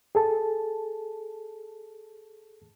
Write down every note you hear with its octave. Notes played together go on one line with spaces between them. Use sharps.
G#4 A4 A5